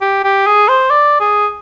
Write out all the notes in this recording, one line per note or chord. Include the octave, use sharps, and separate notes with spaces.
G4
G4
G#4
C5
D5
G#4